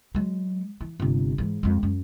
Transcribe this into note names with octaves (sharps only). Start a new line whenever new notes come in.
F#3 G#3
E3
G1 C3
G#2 E3
F2 G#3
F#2